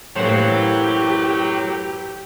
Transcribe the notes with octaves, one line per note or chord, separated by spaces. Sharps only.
F#2 A2 E3 F#3 A#3 G4 C5